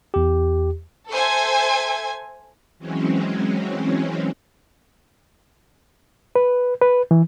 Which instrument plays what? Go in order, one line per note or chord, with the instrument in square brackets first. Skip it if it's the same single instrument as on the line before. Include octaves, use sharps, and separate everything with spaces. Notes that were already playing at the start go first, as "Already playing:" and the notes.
[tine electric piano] E2 G4
[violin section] A4 C5 E5 G#5 G#6
[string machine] E3 F#3 G#3 C4 C#4
[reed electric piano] B4
B4
E3